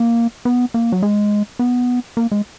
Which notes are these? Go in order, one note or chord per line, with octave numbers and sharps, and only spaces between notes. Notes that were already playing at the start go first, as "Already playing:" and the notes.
Already playing: A#3
B3
A#3
F#3
G#3
B3
A#3
G#3